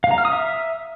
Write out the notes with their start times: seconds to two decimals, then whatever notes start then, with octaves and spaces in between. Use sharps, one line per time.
0.04 F5
0.11 A#5
0.18 F6
0.25 D#6
0.32 E5